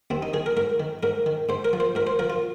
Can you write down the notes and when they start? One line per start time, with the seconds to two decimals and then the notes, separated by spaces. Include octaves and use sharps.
0.10 D#2 C4
0.22 D#4
0.34 D#3 G#4
0.46 A#4
0.57 G#2 A#4
0.80 D#3
1.03 G#2 A#4
1.26 D#3
1.49 G#2 C5
1.65 A#4
1.73 F3
1.80 C5
1.95 G#2 A#4
2.07 C5
2.19 F3 A#4
2.30 F4